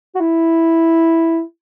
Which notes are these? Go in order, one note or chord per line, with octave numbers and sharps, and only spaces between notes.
F#4
E4